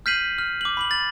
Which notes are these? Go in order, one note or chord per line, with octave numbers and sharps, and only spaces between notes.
F6 G6 B6 C7 D#7 F#7
F6
D6 F#7
B5 D6 F#7
A6 F#7